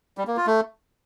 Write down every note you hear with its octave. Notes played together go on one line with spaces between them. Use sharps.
G3
A#3
F4
A3